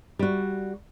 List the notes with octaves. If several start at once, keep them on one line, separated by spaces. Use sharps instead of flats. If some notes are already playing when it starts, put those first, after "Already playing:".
G3 F#4